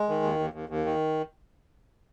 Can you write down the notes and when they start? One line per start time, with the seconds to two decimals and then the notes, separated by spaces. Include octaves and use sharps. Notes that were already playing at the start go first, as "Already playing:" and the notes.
Already playing: G#3
0.09 D#3
0.23 D#2
0.39 D#2
0.53 D#2
0.69 D#2
0.85 D#3